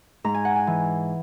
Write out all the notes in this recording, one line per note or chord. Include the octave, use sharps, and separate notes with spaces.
G#2 A#5
G#5
F#5
G#5
E3